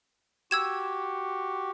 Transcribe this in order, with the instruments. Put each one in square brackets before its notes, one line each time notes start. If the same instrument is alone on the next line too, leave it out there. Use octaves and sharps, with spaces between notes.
[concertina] F#4 G4 [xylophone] E6 G#6 E7